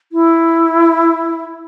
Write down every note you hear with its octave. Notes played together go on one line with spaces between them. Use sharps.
E4